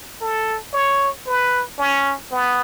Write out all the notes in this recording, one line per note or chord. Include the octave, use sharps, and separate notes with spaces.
A4
C#5
B4
C#4
B3